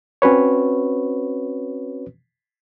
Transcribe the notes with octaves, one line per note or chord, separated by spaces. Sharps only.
C4 C#4 F#4 B4 C#5